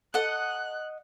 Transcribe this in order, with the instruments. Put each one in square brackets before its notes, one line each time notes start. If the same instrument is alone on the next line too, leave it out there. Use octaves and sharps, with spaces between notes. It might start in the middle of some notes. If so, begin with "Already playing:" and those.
[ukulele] A4 [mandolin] D#5 F#5 [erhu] F#6